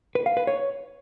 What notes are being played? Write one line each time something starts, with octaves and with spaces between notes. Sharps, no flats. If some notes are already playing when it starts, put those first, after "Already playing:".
B4
F5
B4
C#5